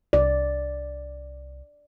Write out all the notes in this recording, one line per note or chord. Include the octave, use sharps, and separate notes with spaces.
C2 D5